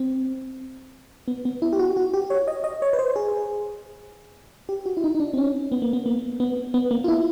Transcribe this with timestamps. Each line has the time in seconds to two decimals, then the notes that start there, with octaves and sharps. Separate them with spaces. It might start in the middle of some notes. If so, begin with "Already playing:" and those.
Already playing: C4
1.28 B3
1.45 B3
1.62 E4
1.73 G4
1.79 F#4
1.97 F#4
2.14 G4
2.30 C#5
2.47 D#5
2.64 D#5
2.82 C#5
2.93 B4
2.99 C5
3.16 G#4
4.69 G4
4.86 F#4
4.97 E4
5.04 D#4
5.15 D#4
5.20 D4
5.33 C4
5.37 C#4
5.72 B3
5.82 A#3
5.93 B3
6.06 A#3
6.40 B3
6.74 B3
6.91 A#3
7.04 F4
7.08 E4